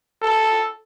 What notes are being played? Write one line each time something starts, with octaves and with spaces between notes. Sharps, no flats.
A4